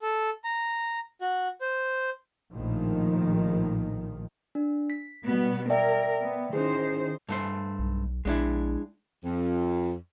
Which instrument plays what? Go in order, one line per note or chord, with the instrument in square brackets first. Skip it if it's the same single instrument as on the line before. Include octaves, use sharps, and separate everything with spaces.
[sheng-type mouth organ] A4
A#5
F#4
C5
[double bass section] A#1 A2 D#3 F3
[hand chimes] D4
B6
[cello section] B2 G3 B3
[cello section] A#4 [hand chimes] D5 E5 G5
[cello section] B3
[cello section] D#3 C5 [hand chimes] C#4 E4 G#4
[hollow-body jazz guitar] G2 A3 C5
[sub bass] B1
[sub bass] A#1 [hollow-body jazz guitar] G#3 D4 E4
[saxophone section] F2